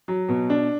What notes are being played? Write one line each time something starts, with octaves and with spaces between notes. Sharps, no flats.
F#3
B2
D4